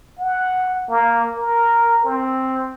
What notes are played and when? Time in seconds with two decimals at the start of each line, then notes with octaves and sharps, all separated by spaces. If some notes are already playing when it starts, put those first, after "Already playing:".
0.19 F#5
0.90 A#3
1.37 A#4
2.04 C4